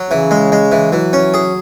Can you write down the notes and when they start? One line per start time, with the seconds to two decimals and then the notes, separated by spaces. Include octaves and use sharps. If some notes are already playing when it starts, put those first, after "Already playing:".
Already playing: F#3
0.10 C#3 E3
0.31 G#3
0.52 G#3
0.72 E3
0.92 E3 F#3
1.13 C#4
1.34 G#4